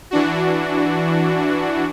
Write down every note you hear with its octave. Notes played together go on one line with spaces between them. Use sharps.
E3 D4 F#4